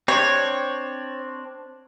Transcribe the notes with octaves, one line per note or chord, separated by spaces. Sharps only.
C4 D4 C#5